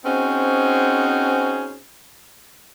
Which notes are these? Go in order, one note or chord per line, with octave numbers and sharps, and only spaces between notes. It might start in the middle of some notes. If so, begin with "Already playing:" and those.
C4 C#4 D#4 F#4 G#4 C5